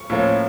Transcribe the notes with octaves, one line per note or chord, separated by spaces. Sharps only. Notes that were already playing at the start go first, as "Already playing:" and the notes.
Already playing: C#6
A2 F3 A#3 C#4